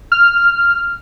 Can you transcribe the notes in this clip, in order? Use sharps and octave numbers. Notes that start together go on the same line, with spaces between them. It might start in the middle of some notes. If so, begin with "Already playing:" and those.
F6